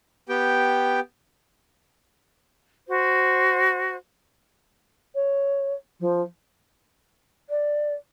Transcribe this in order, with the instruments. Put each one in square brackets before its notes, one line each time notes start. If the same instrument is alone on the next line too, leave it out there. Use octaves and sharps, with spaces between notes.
[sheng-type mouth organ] B3 G4 G5
[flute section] F#4 C5
[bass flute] C#5
F3
[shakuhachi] D5